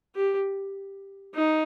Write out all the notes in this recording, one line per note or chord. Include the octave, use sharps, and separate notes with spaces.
G4
D#4